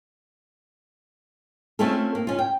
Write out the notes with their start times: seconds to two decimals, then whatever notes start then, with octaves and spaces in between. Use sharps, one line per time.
1.79 A3 C4 C#4 E4 F4 A4
2.15 A#3
2.27 C#4 F4
2.39 G5